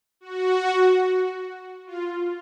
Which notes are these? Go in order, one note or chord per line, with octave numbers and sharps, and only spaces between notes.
F#4
F4